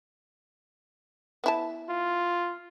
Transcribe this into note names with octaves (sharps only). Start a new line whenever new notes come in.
B3 E4 A5
F4